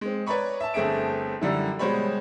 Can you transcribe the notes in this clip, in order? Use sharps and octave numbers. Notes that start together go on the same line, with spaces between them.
G#3 C4
B4 C#5 D5 A#5 B5 C#6
E5 A5
G1 A3 C4 G#4 E5 D7
F#2 D3 G3 E4
B2 G3 G#3 C5 C#5 B5